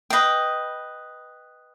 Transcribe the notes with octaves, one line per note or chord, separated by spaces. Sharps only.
B4 D#5 G5